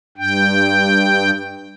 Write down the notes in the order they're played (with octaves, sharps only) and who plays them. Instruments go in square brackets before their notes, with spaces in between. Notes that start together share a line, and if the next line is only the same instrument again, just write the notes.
[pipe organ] G2 G5